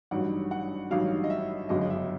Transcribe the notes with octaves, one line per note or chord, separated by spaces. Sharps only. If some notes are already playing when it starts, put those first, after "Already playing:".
A1 G2 D#3 F#3 F#5
F#5
A1 G2 D#3 F#3 F5
D#5
E5
G1 F#2 C#3 D#5
D#5
E5